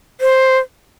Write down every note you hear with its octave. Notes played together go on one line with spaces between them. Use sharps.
C5